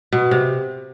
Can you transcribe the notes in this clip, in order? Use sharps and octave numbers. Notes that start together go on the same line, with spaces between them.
B2
C3